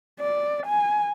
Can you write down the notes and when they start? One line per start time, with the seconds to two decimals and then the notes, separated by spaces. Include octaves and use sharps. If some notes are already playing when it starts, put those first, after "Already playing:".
0.20 D5
0.66 G#5